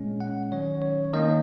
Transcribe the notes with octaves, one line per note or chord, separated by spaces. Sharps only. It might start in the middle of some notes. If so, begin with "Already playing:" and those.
Already playing: A#2 G#3 C#4
F#5
D#3 F#3 C#4 C#5
C#5
D#3 A#3 C#4 D#5